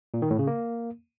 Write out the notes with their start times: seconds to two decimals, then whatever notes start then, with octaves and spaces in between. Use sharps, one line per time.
0.14 A#2
0.22 D#3
0.30 A2
0.39 C#3
0.47 A#3